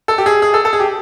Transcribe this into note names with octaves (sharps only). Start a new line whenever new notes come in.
A4
G4
G#4
G#4
A4
A4
G#4
G4